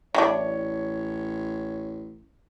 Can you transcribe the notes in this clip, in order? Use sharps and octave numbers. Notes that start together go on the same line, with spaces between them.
A1 E3 G3 D4 C#5